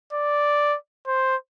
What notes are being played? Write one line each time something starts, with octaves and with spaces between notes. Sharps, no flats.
D5
C5